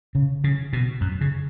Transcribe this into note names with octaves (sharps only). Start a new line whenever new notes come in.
C#3
C#3
B2
F#2
C#3